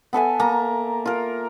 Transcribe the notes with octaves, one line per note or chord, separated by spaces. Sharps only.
B3 A4 E5 G#5
A#3 A5 A#5
F4 A#4